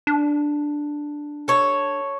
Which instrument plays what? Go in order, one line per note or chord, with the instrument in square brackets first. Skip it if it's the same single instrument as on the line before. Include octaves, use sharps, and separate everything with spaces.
[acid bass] D4
[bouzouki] A4 C#5